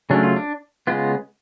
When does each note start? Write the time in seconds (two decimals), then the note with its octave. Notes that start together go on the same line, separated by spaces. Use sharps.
0.10 C#3 F#3 A3 C#4 D4
0.23 F4
0.36 D4
0.87 C#3 G#3 B3 F4